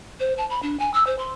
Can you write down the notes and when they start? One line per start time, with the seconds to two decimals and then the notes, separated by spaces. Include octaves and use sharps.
0.20 C5
0.38 A5
0.50 B5
0.63 D4
0.79 G#5
0.94 E6
1.07 C5
1.19 C6